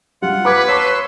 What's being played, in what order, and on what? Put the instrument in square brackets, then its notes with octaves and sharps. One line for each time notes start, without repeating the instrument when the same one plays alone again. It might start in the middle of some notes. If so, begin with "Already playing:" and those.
[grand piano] G3 [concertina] F4 F#5
[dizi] B4 [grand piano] B5 D6 G#6
[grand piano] C#5 A5 C#6 [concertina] C6 E6